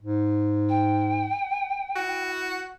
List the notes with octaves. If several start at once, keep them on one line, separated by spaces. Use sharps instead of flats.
G#2
G5
E4 F#4